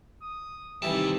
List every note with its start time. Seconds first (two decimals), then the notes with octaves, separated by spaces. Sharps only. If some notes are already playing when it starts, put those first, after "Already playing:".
0.22 D#6
0.82 C2 A#2 D#3 E3 G3 E5 A5